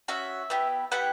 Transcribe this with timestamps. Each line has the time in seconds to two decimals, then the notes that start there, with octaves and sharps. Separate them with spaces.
0.08 C#4 F#4 E5
0.50 B3 E4 G4
0.91 B3 E4 G4 F#5